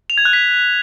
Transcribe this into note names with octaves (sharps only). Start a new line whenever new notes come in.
F7
G#6
F#6
B6